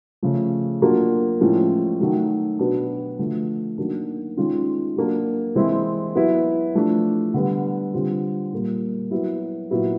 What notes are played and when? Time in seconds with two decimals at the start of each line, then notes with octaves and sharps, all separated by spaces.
0.22 C#3 F3 A3
0.82 F#3 A#3 D4 F4
1.41 A2 F3 G#3 C#4
2.01 D#3 F#3 A3
2.59 B2 F#3 B3 D4
3.19 D3 F3 A3
3.78 D#3 F#3 A#3 D4
4.37 D#3 G#3 C#4 F4
4.96 F#3 A#3 D4
5.55 E3 G#3 C4 E4
6.15 F#3 B3 E4
6.75 F3 A3 D4
7.34 D3 G3 B3
7.93 D3 G3 C4 F4
8.53 A#2 G3 A#3
9.11 F#3 B3 E4
9.71 A#2 F#3 B3 E4